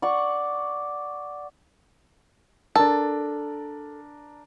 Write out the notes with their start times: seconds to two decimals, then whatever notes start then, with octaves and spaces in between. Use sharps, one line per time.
0.02 D5 F#5 C#6
2.75 D4 A4 A#4